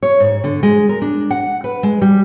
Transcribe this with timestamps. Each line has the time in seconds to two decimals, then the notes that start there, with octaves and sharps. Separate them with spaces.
0.03 C#5
0.20 G#2
0.44 D3
0.63 G#3
0.89 A#4
1.02 D4
1.31 F#5
1.64 B4
1.83 G#3
2.02 G3